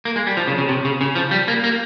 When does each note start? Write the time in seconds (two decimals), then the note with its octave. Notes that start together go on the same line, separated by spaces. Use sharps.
0.05 A#3
0.16 G#3
0.27 G3
0.37 F3
0.48 C#3
0.58 C#3
0.69 C3
0.85 C#3
1.01 C#3
1.15 F3
1.31 G3
1.48 A#3
1.64 A#3